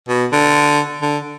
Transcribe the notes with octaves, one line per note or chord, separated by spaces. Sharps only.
B2
D3
D3